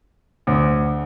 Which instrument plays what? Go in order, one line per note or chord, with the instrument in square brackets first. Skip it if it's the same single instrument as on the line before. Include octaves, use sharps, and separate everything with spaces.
[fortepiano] D2